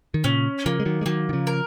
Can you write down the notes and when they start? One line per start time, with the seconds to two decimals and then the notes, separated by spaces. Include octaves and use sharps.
0.14 D#3
0.24 A#2 C#3 C#4
0.66 C#3 F3 A#3
0.80 G#3
0.85 D#3 F#3
1.01 G#3
1.06 D#3 F#3 A#3
1.29 D#3
1.33 C#3 F3
1.47 A#4